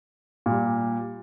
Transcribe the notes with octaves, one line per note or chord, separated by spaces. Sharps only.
A#2 G3